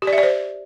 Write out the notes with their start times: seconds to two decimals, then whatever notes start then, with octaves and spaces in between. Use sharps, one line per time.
0.02 G4
0.07 D5
0.13 E5
0.18 D5
0.23 C5